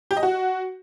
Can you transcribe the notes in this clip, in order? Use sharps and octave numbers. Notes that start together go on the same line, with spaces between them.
G4
D#5
F#4